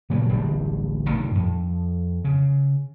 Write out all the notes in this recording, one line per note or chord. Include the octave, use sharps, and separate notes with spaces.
A#2 C#3 F#3 G3
D1 A1 D3 G3
A2 C3 D#3
F2
C#3